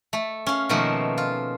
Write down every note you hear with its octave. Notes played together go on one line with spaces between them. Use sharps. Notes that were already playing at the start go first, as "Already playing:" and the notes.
A3
C#4 F5
B2 D#3 F3 A3 A#3
F4